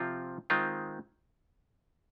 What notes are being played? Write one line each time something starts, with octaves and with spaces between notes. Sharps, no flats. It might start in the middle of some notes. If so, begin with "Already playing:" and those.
Already playing: C3 F3 C4 F4
D#3 G#3 C4 F4